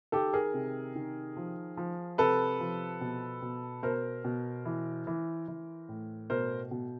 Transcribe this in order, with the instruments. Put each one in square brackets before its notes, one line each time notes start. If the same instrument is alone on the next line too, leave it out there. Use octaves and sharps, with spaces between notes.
[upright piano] D#3 G4 A4
G#4 A#4
C3
D#3
F3
F3
C3 A4 B4
F3
B2
B2
B2 A#4 C5
B2
E3
E3
E3
A2
B2 A#4 C5
B2